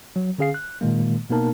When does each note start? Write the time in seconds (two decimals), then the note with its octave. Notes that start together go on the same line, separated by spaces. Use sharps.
0.16 F#3
0.38 D3 C#4 G#4 F5 C7
0.54 F#6
0.81 A#2 D#3 G#3 A#3
1.30 B2 A#3 B3 D#4 A#4 A5